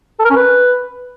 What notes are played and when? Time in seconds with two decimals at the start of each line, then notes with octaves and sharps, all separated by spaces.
0.19 A4
0.25 A#4
0.30 C#4
0.36 B4